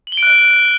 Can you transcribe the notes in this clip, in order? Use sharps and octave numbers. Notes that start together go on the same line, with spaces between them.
F#7
G7
D7
F#6